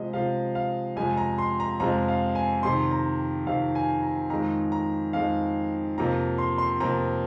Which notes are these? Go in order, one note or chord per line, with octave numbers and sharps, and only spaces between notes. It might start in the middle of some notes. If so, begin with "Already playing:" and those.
Already playing: C3 F3 G#3 D#5
C3 F3 G#3 F5
F5
F2 C3 F3 G#3 G#5
A#5
C6
A#5
F2 C3 F3 G#3 A#5
F5
G#5
F2 C3 D#3 C6
A#5
F2 C3 D#3 F5
G#5
A#5
F2 D#3 G#3 A#5
A#5
F2 D#3 G#3 F5
F2 C3 F3 A#3 A#5
C6
C6
F2 C3 F3 A#3 A#5